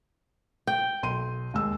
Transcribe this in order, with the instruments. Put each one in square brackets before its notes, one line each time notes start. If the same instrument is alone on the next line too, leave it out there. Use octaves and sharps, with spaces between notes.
[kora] G5
[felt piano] B1 C6 D#7
D#2 G#3 E6